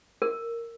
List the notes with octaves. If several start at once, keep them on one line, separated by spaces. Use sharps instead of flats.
A#4